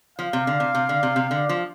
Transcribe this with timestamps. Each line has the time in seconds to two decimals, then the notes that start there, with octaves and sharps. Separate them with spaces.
0.19 F3 F5
0.33 C3
0.47 D3
0.60 C3
0.75 C3
0.89 D3
1.03 C3
1.16 C3
1.31 D3
1.49 F3